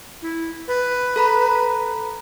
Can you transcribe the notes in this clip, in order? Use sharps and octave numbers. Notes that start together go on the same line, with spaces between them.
E4
B4
A4 A#5 B5